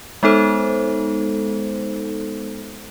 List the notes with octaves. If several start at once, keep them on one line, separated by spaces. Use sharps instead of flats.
G#3 B3 D#4 A4 C5